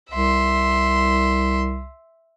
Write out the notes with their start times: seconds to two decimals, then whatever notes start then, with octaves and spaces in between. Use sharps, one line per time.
0.11 C2 E5 C6